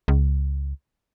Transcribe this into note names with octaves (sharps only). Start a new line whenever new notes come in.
C#2